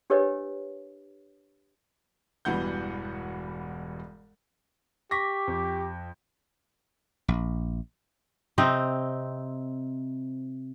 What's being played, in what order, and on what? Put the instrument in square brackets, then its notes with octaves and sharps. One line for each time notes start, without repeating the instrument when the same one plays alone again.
[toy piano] D4 G4 A#4 B4 C#5 D#5
[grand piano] E1 G2 B2 E3 F#5 G6
[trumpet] G4 [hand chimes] C#6 D6 B6 [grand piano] A#6
[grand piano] F2
[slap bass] A#1
[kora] C3 C4 D#4